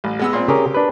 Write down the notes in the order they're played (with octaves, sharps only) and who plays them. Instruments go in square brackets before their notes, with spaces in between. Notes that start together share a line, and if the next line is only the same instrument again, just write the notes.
[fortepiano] A1
G#3 B3 E6
A#2 C4
[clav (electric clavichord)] C#3 G#4 A#4 [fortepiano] G4
[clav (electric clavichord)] D4 B4